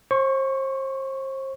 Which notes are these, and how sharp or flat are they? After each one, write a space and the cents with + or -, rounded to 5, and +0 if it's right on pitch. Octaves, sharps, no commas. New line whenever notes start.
C5 +35 C#6 +0